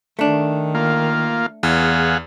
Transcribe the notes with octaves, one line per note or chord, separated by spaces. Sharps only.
D#3 A3 D4
A#3 F4
E2 G#4 F5 F#5